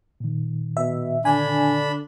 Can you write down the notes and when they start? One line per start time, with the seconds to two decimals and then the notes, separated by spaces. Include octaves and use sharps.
0.20 A#2 D#3
0.77 B2 E5
1.25 D3 D4 G#5 B5